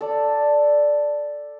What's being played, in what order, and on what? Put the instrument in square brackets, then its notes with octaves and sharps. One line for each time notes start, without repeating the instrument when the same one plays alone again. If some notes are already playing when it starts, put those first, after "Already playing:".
[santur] A4 D5